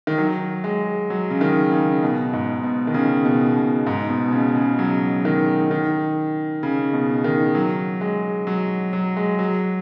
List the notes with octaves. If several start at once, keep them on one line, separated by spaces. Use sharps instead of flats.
D#3
F#3
G#3
F#3
C#3
D#3
C#3
B2
G#2
B2
D#3
C#3
B2
B2
G#2
B2
B2
C#3
C#3
F#3
D#3
D#3
C#3
B2
D#3
F#3
G#3
F#3
F#3
G#3
F#3